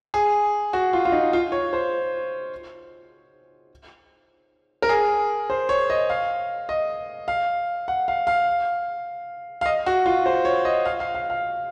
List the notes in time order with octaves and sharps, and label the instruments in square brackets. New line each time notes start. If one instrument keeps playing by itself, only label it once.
[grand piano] G#4
F#4
F4
F4
D#4
F4
C#5
C5
A#4
G#4
C5
C#5
D#5
F5
D#5
F5
F#5
F5
F5
F5
D#5
F#4
F4
C5
C#5
D#5
F5
F5
F5
F5